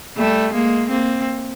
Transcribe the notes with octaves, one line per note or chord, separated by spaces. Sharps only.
G3 A3
G#3 A#3
A#3 C4